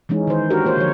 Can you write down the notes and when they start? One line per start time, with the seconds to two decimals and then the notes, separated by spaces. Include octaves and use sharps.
0.09 E3 G#3 C#4 D#4
0.27 D#3 C5
0.50 D4 F#4 G4 A#4
0.65 A#3 F4 C5 C#5
0.77 D3 F3 C#5